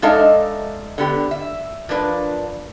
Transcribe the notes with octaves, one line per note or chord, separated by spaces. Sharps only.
G#3 D4 D#4 A4 E5 F5
D3 B3 G4
E5
F3 A#3 D4 B4